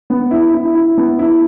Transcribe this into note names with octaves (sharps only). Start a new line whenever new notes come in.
B3
E4
E4
E4
B3
E4